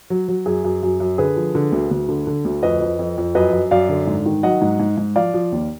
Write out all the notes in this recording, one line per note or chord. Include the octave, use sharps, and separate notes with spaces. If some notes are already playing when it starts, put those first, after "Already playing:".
F#3
F#3
F#2 G#4
F#2
F#2
F#2
D3 G#4 B4
F3
D3
D2
D2
D3
D3
D2
F2 B4 D#5
F2
F2
F2
F#2 B4 D#5
F#2
F#2 D5 F5
D3
G#2
D#3
F#3 D#5 F#5
G#2
G#2
G#2
F3 D5 F5
F3
D#2